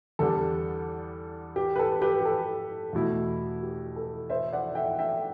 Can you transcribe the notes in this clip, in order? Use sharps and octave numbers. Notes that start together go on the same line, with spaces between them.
E2 D3 G3 D4 A4
G4
B4
A4
G4 B4
G4
A4
E2 B2 A3 E4
G4
A4
C5 E5
D5 F#5
E5 G5
E5 G5